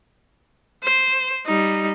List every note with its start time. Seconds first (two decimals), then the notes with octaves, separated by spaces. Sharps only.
0.83 C5
1.46 G3 D#4